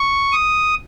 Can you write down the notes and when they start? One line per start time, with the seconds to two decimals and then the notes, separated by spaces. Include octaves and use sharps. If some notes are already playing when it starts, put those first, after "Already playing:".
Already playing: C#6
0.33 D#6